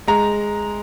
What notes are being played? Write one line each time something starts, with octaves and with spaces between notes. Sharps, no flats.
G#3 A#5